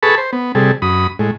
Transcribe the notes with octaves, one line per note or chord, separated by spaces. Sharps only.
G#4 A4 B4 A5 B5 C#6
C5
B3
C3 G3 G#4 A4
F#2 B5 D#6
A2 G#3